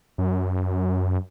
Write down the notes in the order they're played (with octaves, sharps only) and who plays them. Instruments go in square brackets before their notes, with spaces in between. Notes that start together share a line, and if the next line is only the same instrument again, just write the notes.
[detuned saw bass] F#2